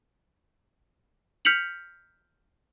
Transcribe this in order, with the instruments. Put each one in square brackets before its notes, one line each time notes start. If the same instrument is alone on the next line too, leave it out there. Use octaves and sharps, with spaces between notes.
[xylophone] F6 G6 B6 C#7 F7 F#7